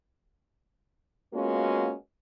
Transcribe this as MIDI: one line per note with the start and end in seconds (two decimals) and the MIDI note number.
1.33 1.93 56
1.33 1.93 58
1.33 1.93 59
1.33 1.93 61
1.33 1.93 65
1.33 1.93 66